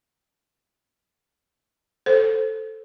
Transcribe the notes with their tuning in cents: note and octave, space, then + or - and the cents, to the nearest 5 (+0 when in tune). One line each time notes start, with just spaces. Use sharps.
A4 +0 C5 +5